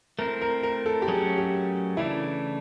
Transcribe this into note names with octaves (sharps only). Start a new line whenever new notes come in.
A3 C4 E4 A#4
A#4
A#4
A4
G4
F#3 A3 C#4 G#4
G4
C#3 E3 A3 D4 E4